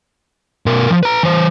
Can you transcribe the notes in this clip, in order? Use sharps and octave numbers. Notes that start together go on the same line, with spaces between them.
B2 A#4
F3
B4 A#5
E3 C5